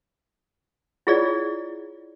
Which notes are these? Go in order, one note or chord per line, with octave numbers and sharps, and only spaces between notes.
E4 F4 G#4 C#5 D5